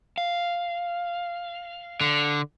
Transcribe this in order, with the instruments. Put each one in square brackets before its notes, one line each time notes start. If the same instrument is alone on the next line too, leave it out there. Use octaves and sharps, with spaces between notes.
[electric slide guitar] F5
[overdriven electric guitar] D3